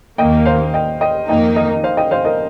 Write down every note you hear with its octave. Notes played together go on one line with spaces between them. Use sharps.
D#2 D#3 A#3 D#5 G5
C5 F5
D#5 G5
D#5 G5
F2 D#3 A#3 D#4 D#5 G5
A#4 D#5
C5 F5
D#5 G5
C5 F5
A#4 D#5